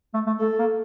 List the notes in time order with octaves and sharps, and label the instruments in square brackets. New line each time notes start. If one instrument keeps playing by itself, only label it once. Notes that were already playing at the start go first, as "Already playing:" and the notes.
[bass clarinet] A3
A3
[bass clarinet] A3 [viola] A4
[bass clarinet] A#3